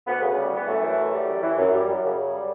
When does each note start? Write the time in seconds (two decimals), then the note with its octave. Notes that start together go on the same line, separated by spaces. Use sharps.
0.07 D2 B3
0.22 C#3
0.37 G3
0.52 E3 B3
0.67 F#2 A3
0.82 E3
0.97 F#2
1.13 G3
1.28 F#2
1.42 E3
1.57 F#2
1.73 G3
1.87 F#2
2.03 C#3
2.17 F#2
2.32 G3